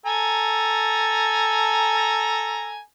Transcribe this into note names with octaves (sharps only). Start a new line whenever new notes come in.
A4 G#5 A#5